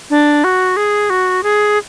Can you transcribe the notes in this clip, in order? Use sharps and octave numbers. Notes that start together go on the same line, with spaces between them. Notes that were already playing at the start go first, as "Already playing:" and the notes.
D4
F#4
G#4
F#4
G#4